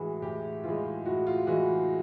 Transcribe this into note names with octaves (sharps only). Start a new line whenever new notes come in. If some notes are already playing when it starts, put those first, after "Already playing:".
Already playing: A2 E3 G#3 F#4 G#4
A2 G4
E3 G#3 F4
A2 F#4
F4
E3 G#3 F#4